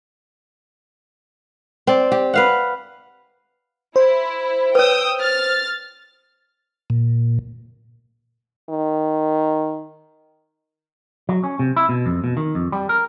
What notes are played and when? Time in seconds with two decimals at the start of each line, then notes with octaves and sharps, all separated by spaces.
1.87 C4 D5
2.12 G4
2.34 B4 F5 F#5
3.96 E4 C5
4.75 B4 C#5 G5 D#6 E6
5.21 F6 A6
6.90 A#2
8.69 D#3
11.29 F#3
11.44 C#4
11.59 C3
11.77 E4
11.89 B2
12.06 F2
12.24 B2
12.37 D#3
12.55 F2
12.72 G3
12.89 A#4